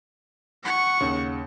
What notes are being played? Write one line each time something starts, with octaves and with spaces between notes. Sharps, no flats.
F#5 C#6
D#2 C#3